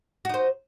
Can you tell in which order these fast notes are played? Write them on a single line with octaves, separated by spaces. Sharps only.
F#4 D#4 C5